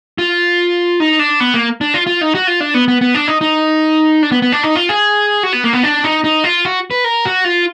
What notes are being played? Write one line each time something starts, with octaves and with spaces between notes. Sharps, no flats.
F4
D#4
D4
B3
A#3
D4
F4
F4
D#4
F#4
F4
D4
B3
B3
B3
D4
D#4
D#4
D4
B3
B3
D4
D#4
F4
G#4
F#4
B3
A#3
B3
D4
D#4
D#4
F4
F#4
B4
A#4
F#4
F4